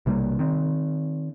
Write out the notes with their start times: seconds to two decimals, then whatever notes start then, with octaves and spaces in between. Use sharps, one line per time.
0.06 B1 C3 G3 A#3
0.39 D#3 C4